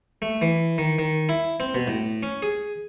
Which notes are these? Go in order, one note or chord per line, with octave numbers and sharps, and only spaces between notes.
A3
E3
D#3
D#3
E4
C4
B2
A2
C#4
G#4